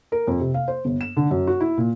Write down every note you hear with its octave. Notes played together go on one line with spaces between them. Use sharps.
A#4
F2
C3
F5
C5
G1
E7
D3
F#2
F#4
E4
A#2